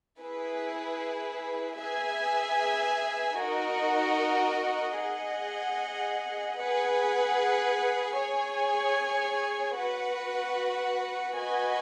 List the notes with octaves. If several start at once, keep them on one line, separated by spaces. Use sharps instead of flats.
E4 G#4 B4
G#4 B4 E5 G#5
D#4 F#4 A#4 D#5 F#5
G#4 D#5 F#5
G#4 B4 F#5
G#4 C#5 G#5
F#4 B4 F#5
F#4 B4 D#5 G#5